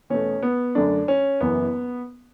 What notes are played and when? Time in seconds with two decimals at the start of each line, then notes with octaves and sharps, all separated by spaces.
0.10 E2 B2 A3 C#4
0.43 B3
0.75 F#2 D3 A3 D4
1.08 C#4
1.40 F#1 F#2 E3 B3